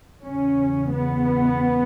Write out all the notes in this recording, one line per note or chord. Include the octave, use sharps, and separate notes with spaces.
E2 C#3 C#4
B3